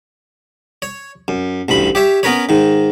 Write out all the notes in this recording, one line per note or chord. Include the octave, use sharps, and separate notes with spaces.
C#5
F#2
A1 D2 G2 B5
G4 C#5 E5
B3 C#4 A#4 B4 C#5
G#2 D#3